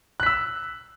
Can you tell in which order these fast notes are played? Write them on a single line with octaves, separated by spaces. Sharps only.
F#6 B6 E6